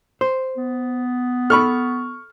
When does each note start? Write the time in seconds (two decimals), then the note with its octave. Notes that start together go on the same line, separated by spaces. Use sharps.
0.21 C5
0.57 B3
1.50 A4 B5 C#6 F6